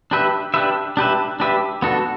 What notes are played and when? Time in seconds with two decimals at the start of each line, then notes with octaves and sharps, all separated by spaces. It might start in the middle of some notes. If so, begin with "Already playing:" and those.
0.11 D4 G4 B4 E5
0.54 D4 G4 B4 E5
0.97 D4 G4 B4 E5
1.40 D4 G4 B4 E5
1.82 B3 D4 F#4 A4